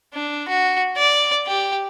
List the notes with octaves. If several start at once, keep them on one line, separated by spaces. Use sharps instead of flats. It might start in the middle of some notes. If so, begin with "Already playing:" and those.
D4
F#4
D5
G4